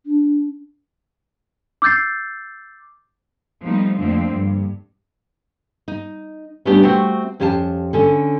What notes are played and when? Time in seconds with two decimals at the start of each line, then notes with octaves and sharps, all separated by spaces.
0.06 D4
1.82 D6 E6 G6 A6 C7
3.61 F3 G3 A3 B3 D#4
3.97 F2 D3 F3 A3 A#3 C4
4.31 G2
5.88 D#4
6.65 G3 A3 B3 C#4 D4 G4
6.82 A3 C4 F#4 C5
7.40 F2 C#4 G4 F5 G5 A5
7.93 D3 C#4 A4